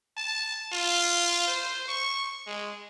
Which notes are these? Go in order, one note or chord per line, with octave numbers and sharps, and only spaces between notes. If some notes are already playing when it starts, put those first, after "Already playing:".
A5
F4
C5
C#6
G#3